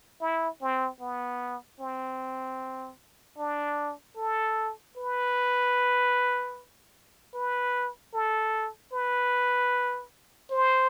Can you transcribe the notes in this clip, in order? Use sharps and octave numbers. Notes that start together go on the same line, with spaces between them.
E4
C4
B3
C4
D4
A4
B4
B4
A4
B4
C5